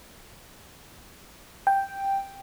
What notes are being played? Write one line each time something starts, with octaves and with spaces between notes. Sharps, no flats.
G5